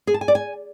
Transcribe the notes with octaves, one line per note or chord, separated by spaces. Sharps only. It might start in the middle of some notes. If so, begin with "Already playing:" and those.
G#4
A5
G#5
D5
G#5